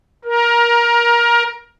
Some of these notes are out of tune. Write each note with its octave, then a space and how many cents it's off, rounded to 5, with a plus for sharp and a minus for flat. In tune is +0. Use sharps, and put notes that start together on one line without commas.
A#4 +20